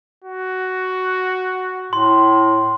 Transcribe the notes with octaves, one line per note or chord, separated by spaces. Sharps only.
F#4
A2 C6